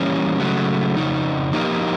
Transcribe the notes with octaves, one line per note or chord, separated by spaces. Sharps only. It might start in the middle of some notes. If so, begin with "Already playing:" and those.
Already playing: E3 G3 A#3 C#4
C#3 F#3 A3
F2 C#3 D#4
F3 A#3 D#4 G4 A#4